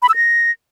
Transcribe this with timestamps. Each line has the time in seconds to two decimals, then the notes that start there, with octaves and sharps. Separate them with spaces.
0.02 B5
0.09 E6
0.16 A#6